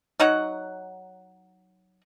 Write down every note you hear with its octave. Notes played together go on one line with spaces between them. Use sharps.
F#3 D#4 C#5 F#5